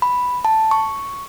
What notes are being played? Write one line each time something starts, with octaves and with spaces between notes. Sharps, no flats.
B5
A5
C#6